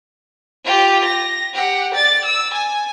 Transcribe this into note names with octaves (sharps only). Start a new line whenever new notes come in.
F4 G4
A#6
G4 F#5
D5 A6
E6
G#5